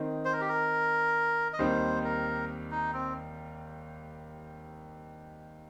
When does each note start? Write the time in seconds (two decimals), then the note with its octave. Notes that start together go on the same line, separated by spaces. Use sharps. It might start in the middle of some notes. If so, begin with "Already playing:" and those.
Already playing: D#3 C4 D#4
0.25 C5
0.33 A#4
0.41 G4
0.49 A#4
1.53 D#5
1.59 D#2 D#3 G3 C4 D#4 C5
2.05 A#4
2.71 D#4
2.93 C4